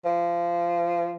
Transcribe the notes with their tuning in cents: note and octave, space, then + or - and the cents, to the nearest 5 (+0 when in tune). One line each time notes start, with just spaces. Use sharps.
F3 -20